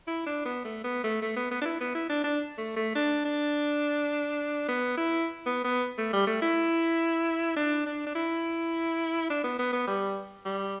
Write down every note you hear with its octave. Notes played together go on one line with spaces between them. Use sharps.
E4
D4
B3
A3
B3
A3
A3
B3
B3
D4
E4
B3
E4
D4
D4
A3
A3
D4
D4
B3
E4
B3
B3
A3
G3
A3
E4
D4
D4
D4
E4
D4
B3
B3
B3
G3
G3